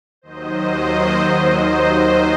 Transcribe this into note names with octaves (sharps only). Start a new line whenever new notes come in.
D#2 D#3 F#3 C5 D#5
C5